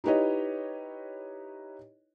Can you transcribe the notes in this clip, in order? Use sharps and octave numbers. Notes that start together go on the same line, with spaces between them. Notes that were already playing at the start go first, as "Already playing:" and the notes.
D#4 E4 G4 B4 C#5 D#5